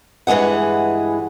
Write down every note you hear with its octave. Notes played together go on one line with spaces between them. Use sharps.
G2 E3 G#3 G#4 F#5